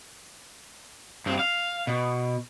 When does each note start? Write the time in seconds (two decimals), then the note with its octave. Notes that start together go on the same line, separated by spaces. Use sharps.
1.26 G2 C4
1.39 F5
1.87 B2